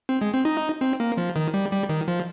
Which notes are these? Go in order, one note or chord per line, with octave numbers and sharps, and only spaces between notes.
C4
G#3
C4
D#4
C4
A#3
F3
D#3
G3
G3
D#3
F3